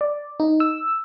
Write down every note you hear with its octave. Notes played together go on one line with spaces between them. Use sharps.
D5
D#4
E6